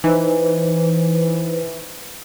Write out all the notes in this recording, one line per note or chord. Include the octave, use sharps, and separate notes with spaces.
E3 D#4 B4 C5